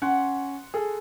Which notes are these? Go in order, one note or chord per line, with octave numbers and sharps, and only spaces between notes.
C#4 F#5 C6
G#4 A4